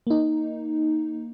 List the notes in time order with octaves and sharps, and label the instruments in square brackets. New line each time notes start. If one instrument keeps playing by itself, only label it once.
[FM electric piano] A#3 D#4